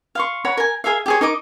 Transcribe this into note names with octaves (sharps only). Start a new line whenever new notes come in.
F5 C6 C#6
C#5 F#5 A#5 B5
A#4 G#5
G#4 A#4 E5 F5
G4 G#4 C#5
D#4 A#4 D#5 D6